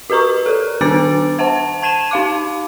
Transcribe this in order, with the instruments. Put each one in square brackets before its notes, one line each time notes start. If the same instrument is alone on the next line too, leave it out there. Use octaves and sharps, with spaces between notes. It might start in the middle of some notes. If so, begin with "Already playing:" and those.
[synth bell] F#4 G4 B4 A#5 C#6
A4 A#4
D#3 B3 D4 D6 A6 D7
C5 F#5 A5
A5 G#6 D#7 E7
D#4 F5 D6